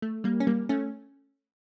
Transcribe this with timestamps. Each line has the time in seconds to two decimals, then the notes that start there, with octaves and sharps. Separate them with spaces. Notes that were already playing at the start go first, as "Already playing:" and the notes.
0.02 A3
0.24 G3 A#3
0.40 C#4
0.47 G3 A#3
0.69 A3 C#4